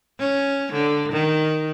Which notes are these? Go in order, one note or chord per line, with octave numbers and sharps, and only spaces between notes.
C#4
D3
D#3